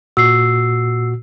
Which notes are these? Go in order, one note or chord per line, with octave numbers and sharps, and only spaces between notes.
A#2 F#4 E6 C7